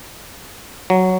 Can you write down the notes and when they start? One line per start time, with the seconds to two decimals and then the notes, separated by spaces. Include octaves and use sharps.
0.90 F#3